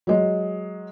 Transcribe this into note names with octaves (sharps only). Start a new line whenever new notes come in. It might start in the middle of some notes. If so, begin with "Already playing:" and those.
F#3 G#3